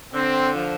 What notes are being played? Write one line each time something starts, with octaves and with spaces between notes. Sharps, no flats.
D3 C4
F3